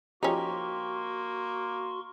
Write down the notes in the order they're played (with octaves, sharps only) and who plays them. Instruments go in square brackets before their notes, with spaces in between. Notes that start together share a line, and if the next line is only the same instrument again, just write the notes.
[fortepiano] F3 G4 [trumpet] A#3 [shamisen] C#4 D#4 [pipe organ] F#4 C6 C#6